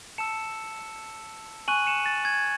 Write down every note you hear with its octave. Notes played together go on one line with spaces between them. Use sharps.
A5 E6 C#7 E7
G#5 C#6 F#6 D#7 F#7
C#7 E7
A6
G#6